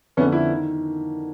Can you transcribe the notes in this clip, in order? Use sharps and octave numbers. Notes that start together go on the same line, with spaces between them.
F2 D3 B3 C#4
E4
D#3